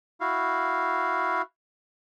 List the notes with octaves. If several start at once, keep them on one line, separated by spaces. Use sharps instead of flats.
E4 F#4 F5